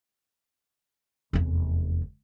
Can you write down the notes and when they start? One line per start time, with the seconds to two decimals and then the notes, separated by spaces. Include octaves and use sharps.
1.33 F1 E2